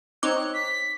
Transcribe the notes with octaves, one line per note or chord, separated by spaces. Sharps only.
C4 D#4 C#5 D6 F#6
B6